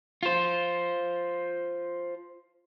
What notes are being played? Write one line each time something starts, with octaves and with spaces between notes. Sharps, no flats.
F4 C5